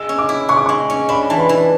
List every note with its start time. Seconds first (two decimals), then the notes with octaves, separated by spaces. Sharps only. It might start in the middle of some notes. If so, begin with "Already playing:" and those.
Already playing: G#3 G#4 E6
0.09 C#4
0.18 D6
0.29 E4
0.49 G#4 C#6
0.57 D6
0.66 G#3 C#6
0.90 C#4
1.09 D4 B5
1.30 E3 A5
1.40 B5
1.49 E3